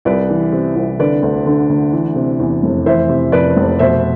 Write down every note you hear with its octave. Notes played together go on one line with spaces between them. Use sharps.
C2 B4 D5
E3
C3
C2
D3 B4 D5
D2
D3
D2
E3
C3
E2
F1
E3 C5 E5
C3
F2 B4 D5
F1
B2 C5 E5